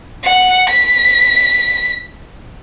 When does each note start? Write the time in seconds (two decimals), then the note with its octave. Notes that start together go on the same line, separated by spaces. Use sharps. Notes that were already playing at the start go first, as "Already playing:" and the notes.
0.24 F#5
0.69 B6